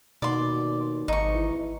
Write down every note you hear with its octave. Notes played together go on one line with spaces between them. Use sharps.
D#2 B2 D5 C6
G#1 D#4 C#6
E3